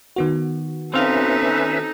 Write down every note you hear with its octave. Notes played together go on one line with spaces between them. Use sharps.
D#3 B3 F#4
C4 C#4 D#4 A4 B4 E5 F5